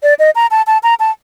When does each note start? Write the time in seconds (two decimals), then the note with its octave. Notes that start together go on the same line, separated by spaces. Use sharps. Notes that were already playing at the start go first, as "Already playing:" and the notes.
0.03 D5
0.19 D#5
0.35 A#5
0.51 A5
0.67 A5
0.83 A#5
1.00 A5